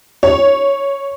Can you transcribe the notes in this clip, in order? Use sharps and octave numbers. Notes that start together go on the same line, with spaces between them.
C#5